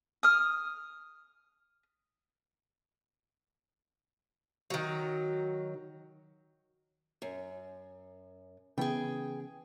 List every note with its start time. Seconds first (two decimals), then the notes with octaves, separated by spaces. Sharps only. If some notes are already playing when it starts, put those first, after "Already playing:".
0.23 D#6 F6
4.70 D#3 F#3
7.22 F#2
8.78 C#3 E3 B3 G#4 G5